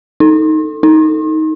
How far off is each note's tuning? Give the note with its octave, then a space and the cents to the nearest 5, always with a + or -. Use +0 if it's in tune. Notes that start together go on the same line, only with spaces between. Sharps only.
D#4 +10
D#4 +15